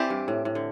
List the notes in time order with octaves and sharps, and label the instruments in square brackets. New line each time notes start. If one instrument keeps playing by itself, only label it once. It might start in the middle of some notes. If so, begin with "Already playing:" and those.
Already playing: [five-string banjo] E3 C4 G4 D5
[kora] G2
A2
A2
D3